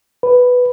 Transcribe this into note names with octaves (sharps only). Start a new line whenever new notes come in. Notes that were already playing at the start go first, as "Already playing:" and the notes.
B4